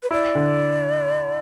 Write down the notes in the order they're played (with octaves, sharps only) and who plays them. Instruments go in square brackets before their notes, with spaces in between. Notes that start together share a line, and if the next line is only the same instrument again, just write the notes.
[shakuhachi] B4
[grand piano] E4 [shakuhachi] D5
[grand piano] D3